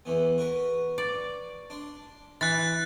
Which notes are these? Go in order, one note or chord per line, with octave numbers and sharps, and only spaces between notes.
E2 E3 B3
F#4 A#4 B4
D5
D4 C6
E3 F#6 A6